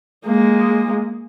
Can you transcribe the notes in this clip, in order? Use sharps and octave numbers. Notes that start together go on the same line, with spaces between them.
G#3 A#3